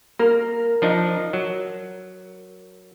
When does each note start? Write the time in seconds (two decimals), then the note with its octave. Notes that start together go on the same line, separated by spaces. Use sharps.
0.19 A#3 A#4
0.82 F3 D4 D#4
1.33 F#3